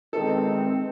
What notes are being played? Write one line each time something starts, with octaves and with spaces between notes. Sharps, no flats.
E2 D#3 G#3 C4 A4